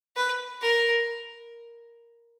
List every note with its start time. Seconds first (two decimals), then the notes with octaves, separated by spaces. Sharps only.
0.16 B4
0.62 A#4